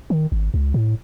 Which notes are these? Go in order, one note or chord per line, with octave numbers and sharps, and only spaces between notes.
D#3
G#1
C#2
A2